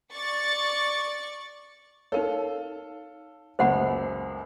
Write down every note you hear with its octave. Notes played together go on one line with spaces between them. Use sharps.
D5 C#6 A6 C#7
D#4 A4 A#4 C#5 F5
C#2 F#2 A#2 C5 F#5 B5